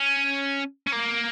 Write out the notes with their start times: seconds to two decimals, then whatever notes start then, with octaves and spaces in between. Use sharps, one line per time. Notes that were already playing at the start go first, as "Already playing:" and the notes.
Already playing: C#4
0.87 C#4
0.92 A#3